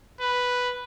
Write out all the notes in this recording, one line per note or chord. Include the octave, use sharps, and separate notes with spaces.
B4